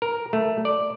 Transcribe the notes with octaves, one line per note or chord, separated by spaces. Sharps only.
A#4
A3
D5